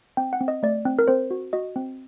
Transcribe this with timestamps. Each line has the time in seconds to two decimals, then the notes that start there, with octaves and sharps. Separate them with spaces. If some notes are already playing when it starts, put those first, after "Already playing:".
0.17 C4 G5
0.33 F#5
0.41 C4
0.48 D#5
0.63 A3 D5
0.85 C4
0.99 A#4
1.08 C4 C5
1.31 F#4
1.53 F#4 D#5
1.76 C4